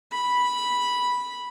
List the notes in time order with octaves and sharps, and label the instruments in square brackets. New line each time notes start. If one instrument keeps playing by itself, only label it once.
[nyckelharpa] B5